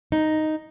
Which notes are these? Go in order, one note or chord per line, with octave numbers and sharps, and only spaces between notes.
D#4